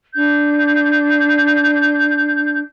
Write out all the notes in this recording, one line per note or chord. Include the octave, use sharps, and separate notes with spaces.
D4 G6